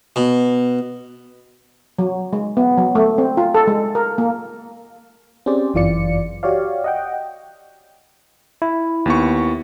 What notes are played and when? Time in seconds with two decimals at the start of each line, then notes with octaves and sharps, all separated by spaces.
0.16 B2
1.99 F#3
2.33 G#3
2.57 B3
2.78 F#3
2.95 A3
3.18 C4
3.37 F4
3.54 A4
3.67 G#3
3.95 A#4
4.18 A#3
5.46 C4 C#4 G4 G#4 C5 D5
5.74 G1 F#2 E3 F4 D5 C#7
6.43 F#4 G4 C#5 D5 F5
6.84 D#5 F#5 G5
8.62 E4
9.06 D#2 B3 C#6